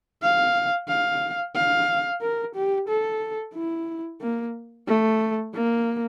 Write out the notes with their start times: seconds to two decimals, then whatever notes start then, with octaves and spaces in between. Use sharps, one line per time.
0.22 F5
0.88 F5
1.55 F5
2.22 A#4
2.55 G4
2.89 A4
3.55 E4
4.21 A#3
4.88 A3
5.54 A#3